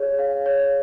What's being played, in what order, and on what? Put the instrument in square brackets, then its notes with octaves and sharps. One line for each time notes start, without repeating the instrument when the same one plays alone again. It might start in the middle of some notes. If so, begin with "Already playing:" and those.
Already playing: [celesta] G#4 C#5
F5
C#5